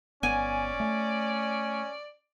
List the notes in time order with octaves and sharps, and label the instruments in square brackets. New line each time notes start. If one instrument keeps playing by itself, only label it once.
[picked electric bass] G1 B3 [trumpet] C#4 [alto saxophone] D5 [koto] G#5
[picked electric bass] A3